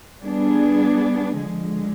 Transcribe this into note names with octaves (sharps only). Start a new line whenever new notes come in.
G3 B3 D4 G#4
D3 F3 G#3